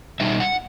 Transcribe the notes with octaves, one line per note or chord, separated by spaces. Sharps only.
B2 G3 D#4 E5
F#5